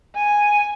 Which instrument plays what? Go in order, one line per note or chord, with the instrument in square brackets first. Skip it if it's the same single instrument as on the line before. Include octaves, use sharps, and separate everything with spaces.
[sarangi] G#5